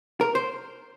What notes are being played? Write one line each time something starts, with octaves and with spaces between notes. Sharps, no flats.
A#4
C5